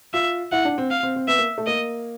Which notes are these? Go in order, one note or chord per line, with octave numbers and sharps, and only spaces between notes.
F4 E5
E4 F#5
D4
C4
F5
C4
C4
B3 E5
A#3
A3
A#3 D#5